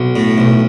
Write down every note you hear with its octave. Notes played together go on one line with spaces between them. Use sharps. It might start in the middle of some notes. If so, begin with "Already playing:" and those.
Already playing: B1
A2
B1